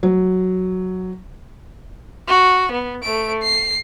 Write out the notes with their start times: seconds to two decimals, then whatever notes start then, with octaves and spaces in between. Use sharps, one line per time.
0.03 F#3
2.28 F#4
2.72 B3
3.03 A3 D7
3.43 C7